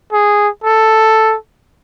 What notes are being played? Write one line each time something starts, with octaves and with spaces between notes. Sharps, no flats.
G#4
A4